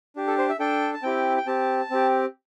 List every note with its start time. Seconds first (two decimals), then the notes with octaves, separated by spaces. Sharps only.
0.16 D4 G4
0.27 A4
0.38 C5
0.49 E5
0.59 D4 A4 G5
0.94 A5
1.03 C4 E4 G4 G5
1.37 G5
1.46 C4 G4 A5
1.90 C4 G4